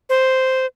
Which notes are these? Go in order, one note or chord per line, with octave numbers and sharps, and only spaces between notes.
C5